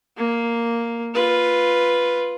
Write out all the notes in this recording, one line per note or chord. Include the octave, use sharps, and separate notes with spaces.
A#3
F4 B4